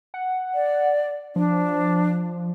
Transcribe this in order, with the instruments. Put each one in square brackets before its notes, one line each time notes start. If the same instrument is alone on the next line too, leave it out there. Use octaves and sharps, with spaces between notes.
[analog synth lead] F#5
[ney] D5
[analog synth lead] F3 [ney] D4